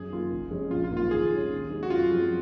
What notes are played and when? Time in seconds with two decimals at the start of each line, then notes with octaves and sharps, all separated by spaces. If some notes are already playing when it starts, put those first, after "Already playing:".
Already playing: F#2 G#4
0.10 D#3 A#3 F4
0.31 F#1
0.50 F2 C#3 G#3 C#4
0.71 A#1 F4
0.84 F4
0.90 G#2 D#3 A#3 D#4
0.97 F4
1.11 D#2 G#4
1.31 D#3 G#3 C#4
1.51 D#2
1.70 C#3 G#3 D#4
1.83 F#4
1.90 F#2 F4
2.10 F3 G#3 C4